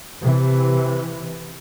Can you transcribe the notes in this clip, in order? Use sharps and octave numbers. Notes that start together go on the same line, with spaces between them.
C3 E3